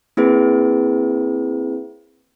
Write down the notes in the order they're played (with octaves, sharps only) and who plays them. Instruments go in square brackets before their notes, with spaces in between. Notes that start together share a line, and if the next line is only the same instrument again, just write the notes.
[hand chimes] A#3 C4 E4 G#4 B4